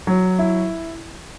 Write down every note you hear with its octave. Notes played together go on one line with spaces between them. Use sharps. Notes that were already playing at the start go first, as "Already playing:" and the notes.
F#3
E4